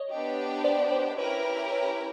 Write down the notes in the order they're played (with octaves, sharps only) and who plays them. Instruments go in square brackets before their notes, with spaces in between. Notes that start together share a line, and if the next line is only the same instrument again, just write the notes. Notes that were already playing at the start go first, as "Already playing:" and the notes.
Already playing: [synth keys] C#5 D#5
[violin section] B3 D4 G4
[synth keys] C5 D5
C5 D5
[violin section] C#4 E4 G4 A#4 [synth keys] B4 C#5
[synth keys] B4 C#5